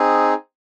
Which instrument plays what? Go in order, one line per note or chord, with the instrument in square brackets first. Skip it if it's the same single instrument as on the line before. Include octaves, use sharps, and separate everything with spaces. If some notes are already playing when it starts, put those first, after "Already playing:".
Already playing: [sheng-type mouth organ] C4 D#4 G#4